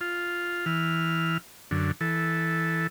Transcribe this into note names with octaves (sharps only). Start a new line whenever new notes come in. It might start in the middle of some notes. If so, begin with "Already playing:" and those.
F4
E3 F6
F#2 D3
E3 A4